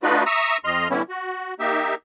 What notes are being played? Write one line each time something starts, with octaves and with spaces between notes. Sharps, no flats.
A3 D4 D#4 F4 F#4 B4
E5 A#5 C#6 D#6 E6
F2 D#5 C6 F6
D3 E3 G3 B3 C#4 E4
F#4
A#3 D#4 G4 E5